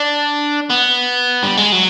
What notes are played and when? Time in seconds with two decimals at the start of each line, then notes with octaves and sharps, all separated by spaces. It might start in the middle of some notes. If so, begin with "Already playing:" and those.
Already playing: D4
0.70 B3
1.43 G3
1.57 G#3
1.72 F#3